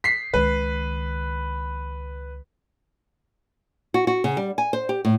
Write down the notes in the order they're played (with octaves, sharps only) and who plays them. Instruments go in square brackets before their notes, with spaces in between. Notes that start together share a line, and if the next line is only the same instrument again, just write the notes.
[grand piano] B6 C7
[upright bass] C#2 D#3 [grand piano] B4
[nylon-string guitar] F#4
F#4
C#3
G3
G#5
C5
G4
A2